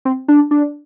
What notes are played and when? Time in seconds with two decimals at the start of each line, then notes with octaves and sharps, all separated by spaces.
0.05 C4
0.28 D4
0.51 D4